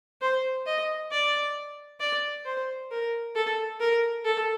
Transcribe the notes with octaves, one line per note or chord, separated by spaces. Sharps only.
C5
D#5
D5
D5
C5
A#4
A4
A#4
A4